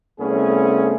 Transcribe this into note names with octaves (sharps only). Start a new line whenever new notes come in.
C2 A3 B3 C#4 G#4